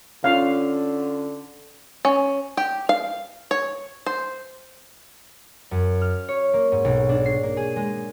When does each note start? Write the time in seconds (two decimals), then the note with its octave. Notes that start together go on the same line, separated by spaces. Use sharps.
0.24 D3 C#4 F4 F5
2.05 C#4
2.57 G4
2.89 F5
3.51 C#5
4.06 C5
5.71 F#2
6.01 F6
6.29 C#5
6.54 A#3
6.72 G#2
6.85 B1
7.09 D4
7.26 C7
7.43 A#3
7.57 G#4
7.76 G#3